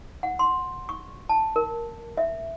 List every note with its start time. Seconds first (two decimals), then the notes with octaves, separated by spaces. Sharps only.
0.23 F#5
0.39 C6
0.89 C#6
1.29 A5
1.56 A#4
2.17 E5